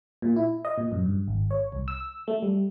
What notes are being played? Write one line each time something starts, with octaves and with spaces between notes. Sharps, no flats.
A#2
E4
D#5
A#2
F#2
G2
G#1
C#5
C2
E6
A3
G3